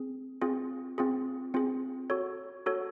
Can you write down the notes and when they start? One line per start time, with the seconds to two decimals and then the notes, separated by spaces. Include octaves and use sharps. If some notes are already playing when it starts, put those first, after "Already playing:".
Already playing: C4 G#4
0.41 C4 F4 G#4
0.98 C4 F4 G#4
1.54 C4 F4 G#4
2.10 F#4 A4 C#5
2.66 F#4 A4 C#5